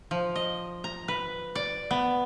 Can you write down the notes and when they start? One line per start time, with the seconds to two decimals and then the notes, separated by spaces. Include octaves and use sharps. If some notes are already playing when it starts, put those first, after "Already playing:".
0.11 F3
0.35 D#5
0.84 A#5
1.08 B4
1.55 D5
1.91 B3